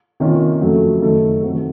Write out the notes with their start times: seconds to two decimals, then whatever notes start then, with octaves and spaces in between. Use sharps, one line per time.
0.20 C3 D#3 A#3 C#4 F4
0.61 F2 C#3 F#3 A3
1.02 F#2 D#3 A3 D#4 A4
1.43 C3 D#3 A3 C4 F#4